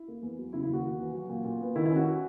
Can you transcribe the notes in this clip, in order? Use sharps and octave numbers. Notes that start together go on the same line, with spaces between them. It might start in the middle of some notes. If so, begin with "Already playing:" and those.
Already playing: E4
A#3
E2
F#3
C#3 E4
E4
D#2 F#4
D#2
E3
F#3 F#4
A#2
A#2
B3
D#3 E4
E4
C#4
F#4